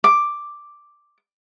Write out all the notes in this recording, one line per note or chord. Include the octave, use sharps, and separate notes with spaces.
D6